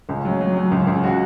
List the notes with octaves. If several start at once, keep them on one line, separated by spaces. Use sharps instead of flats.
C#2
F#3
F#3
F#3
C#2
C#2
F#4